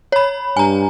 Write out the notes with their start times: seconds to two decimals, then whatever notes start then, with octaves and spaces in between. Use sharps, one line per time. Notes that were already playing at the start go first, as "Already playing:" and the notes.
0.12 C#5 B5
0.57 G2 G#5 A#5